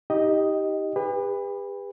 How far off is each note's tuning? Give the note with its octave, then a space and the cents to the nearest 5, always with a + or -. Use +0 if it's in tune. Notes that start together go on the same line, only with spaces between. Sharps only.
D#4 +30 G4 +0 D#5 +0
G4 +45 B4 +0